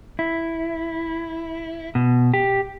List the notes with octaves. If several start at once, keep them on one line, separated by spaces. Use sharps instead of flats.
E4
B2
G4